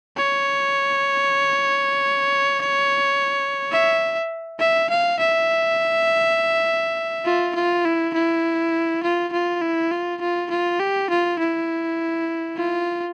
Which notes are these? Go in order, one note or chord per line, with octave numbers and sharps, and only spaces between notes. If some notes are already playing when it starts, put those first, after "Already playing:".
C#5
E5
E5
F5
E5
F4
F4
E4
E4
F4
F4
E4
F4
F4
F4
G4
F4
E4
F4